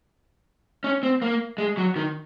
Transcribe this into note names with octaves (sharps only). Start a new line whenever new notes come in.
C#4
C4
A#3
G#3
F#3
D#3